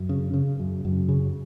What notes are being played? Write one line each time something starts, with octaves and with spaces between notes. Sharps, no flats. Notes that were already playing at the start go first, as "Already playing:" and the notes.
Already playing: F#2
C#3
C#3
F#2
F#2
C#3